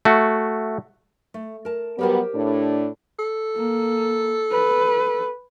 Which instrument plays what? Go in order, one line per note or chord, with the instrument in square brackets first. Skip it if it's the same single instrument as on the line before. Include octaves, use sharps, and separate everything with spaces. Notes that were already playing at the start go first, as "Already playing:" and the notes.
[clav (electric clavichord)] A3 F#4
[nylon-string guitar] A3
A#4 A5
[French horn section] F#3 G3 B3 [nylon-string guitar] G4 A#4 C5
[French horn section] A2 D4
[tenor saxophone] A4
[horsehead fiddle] A#3
B4